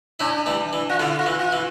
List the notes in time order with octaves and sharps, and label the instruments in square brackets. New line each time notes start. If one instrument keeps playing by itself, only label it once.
[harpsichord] C#4 E4 [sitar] D4
[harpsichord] E3 G3
E3
[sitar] F4
[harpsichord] D3 [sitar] E4
[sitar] F4
[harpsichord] E3
[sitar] F4
[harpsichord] E3